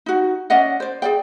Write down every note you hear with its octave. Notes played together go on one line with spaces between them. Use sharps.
D#4 F#4
C#4 D5 D#5 F#5
C5 D5
G#4 D5 G5